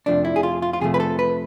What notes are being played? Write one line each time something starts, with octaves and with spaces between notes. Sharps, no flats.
F2 C3 F3 A3 D4
E4
G#4
F4
F4
F4
F2 C3 F3 A3 G#4
B4
A4
B4